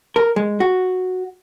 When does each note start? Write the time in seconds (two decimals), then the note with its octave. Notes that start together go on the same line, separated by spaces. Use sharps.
0.16 A#4
0.36 G#3
0.60 F#4